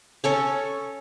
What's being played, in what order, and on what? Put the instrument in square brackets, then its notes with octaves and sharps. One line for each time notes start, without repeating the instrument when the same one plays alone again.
[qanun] C#4 A4 C#5